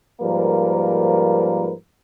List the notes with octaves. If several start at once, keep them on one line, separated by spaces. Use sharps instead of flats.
G#2 F3 G3 A#3 A#4 B4